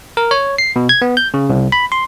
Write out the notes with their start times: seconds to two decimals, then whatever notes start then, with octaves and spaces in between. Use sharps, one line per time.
0.17 A#4
0.31 C#5
0.58 C7
0.76 B2
0.89 G#6
1.02 B3
1.17 G6
1.34 C#3
1.50 C2
1.72 B5
1.92 C6